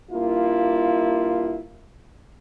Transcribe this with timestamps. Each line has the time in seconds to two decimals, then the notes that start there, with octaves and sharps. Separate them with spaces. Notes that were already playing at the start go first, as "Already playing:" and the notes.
0.11 G2 A#3 E4 F4